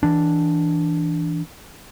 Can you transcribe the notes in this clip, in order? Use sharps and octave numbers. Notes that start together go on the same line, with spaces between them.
E3 D4